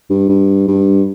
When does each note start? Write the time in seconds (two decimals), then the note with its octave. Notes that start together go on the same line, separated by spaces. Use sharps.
0.10 G2
0.29 G2
0.68 G2